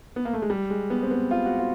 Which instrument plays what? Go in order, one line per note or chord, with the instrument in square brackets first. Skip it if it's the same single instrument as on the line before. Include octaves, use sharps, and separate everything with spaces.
[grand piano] B3
A#3
A3
G#3
G3
G#3
B3
C4
B3
F4
F#4
F4